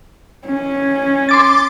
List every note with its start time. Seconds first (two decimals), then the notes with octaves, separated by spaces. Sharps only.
0.46 C#4
1.29 C6 D6 A6